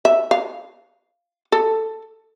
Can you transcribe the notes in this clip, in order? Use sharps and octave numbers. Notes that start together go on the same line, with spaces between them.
E5
F5
A4